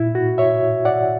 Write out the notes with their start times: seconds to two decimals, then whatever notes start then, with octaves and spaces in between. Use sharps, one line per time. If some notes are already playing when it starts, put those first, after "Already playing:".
Already playing: A#2 E4
0.15 F#4
0.38 C#5 E5
0.85 D5 F#5